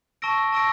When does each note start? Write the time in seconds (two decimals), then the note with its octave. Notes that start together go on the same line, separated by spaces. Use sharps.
0.22 A5 C#6 E6 A#6 D7
0.52 A5 C#6 E6 A#6 D7